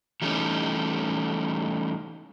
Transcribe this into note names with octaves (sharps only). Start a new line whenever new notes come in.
E3 G3 A3 C#4 D#4